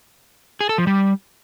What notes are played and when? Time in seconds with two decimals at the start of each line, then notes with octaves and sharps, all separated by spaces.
0.61 G#4
0.69 A4
0.78 F3
0.87 G3